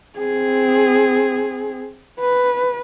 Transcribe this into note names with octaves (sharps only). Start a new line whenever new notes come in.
C4 G#4
B4